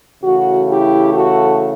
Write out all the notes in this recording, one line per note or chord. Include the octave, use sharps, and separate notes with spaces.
C#3 E3 A3 F#4
E4 G4
F#4 A4